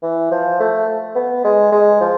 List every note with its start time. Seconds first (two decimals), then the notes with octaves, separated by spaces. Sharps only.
0.03 E3
0.31 F3
0.60 A3
1.15 B3
1.44 G#3
1.72 G#3
2.00 F3